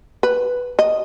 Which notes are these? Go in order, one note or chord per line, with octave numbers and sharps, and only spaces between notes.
B4
D#5